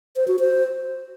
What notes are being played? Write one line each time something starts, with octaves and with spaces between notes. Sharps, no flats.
C5
F#4
C5